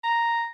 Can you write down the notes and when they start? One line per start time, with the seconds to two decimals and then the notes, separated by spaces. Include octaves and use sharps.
0.04 A#5